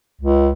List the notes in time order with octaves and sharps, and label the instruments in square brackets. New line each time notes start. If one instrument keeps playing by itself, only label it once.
[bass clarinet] C#2